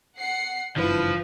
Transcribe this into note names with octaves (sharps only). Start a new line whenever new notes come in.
F#5 C7 C#7
F#1 G2 E3 F3 B4